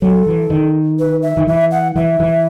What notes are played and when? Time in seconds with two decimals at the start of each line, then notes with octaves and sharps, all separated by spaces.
0.02 F#3 A4
0.26 E3
0.50 D#3
0.99 B4
1.23 E5
1.37 D#3
1.47 E3 E5
1.71 F#5
1.96 E3 E5
2.20 E3